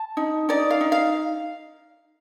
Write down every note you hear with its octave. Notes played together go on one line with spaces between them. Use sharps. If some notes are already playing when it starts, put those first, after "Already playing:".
Already playing: A5
D#4
D#4 D5
F5
D#4
F5